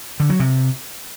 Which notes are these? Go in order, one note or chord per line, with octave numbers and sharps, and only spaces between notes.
D3
F#3
C3